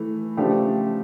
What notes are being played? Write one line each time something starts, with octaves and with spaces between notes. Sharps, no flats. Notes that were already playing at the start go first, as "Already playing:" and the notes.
Already playing: E3 A3
C#3 F3 A3 D4 G4